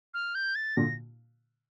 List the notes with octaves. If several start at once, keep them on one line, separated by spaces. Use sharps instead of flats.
F6
G6
A6
A#2 D3 A#6